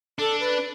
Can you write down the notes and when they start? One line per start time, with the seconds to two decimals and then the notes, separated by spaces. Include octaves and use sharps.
0.19 D4 A4
0.40 B4